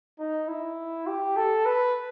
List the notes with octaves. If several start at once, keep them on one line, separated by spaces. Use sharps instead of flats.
D#4
E4
G4
A4
B4